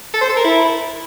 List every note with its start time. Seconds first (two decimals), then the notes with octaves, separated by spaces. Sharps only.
0.13 A4
0.21 C5
0.29 A4
0.37 A#4
0.45 E4